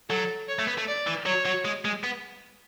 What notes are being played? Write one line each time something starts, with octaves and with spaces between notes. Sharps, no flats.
F#3 A4
C#5
A3
B3
A3
D5
E3
F#3 C#5
F#3
G#3
G#3
B3